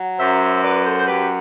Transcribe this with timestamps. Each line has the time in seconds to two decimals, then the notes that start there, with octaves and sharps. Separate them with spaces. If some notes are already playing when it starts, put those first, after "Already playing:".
Already playing: F#3
0.19 F#2 C5 E5
0.63 F#3 B4 D5
0.85 A4 C5
0.99 C5
1.08 F#2 G4 B4